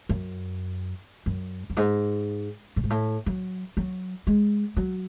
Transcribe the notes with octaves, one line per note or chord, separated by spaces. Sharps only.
F#2
F#2
F#2
G#2
A2
G#2
A2
F#3
F#3
G#3
F#3